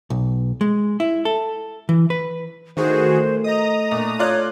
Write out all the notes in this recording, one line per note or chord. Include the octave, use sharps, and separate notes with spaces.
B1
G#3
E4
A4
E3
B4
A2 D#3 F#4 G#4 A#4 C5 C6
D#5 A#5 D#6
A#2 A3 D4
F4 C#5 D5 F#6